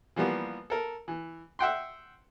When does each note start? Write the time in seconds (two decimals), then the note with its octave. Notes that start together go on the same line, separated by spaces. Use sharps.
0.16 E3 F3 G3 A#3 B3
0.70 A4 A#4
1.08 E3
1.59 E5 F#5 G5 C6